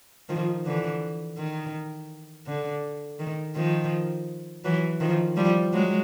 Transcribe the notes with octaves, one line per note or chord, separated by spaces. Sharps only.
D#3 F3
D3 E3
D#3
D3
D#3
D#3 F3
E3 F#3
D#3 F3
F3 G3
F#3 G#3